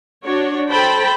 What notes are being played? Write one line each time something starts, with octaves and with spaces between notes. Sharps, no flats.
D4 F#4 C#5
A4 C5 G5 A5 B5